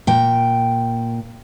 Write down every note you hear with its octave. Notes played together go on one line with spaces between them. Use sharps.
A#2 G5